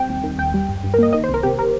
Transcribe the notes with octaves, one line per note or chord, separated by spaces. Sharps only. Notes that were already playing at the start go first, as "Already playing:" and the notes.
Already playing: G3 C4 G5
D#2
D#3
D#2 G5
G3
G1
G2
A#4
A#3 D#5
D#3 D#5
C5
C2
A#4
C3 G4
A#4